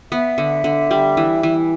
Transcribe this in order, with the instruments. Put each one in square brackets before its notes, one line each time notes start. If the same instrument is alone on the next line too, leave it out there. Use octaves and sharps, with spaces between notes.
[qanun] B3 [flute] E5
[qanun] D3
D3
G3
E3
E3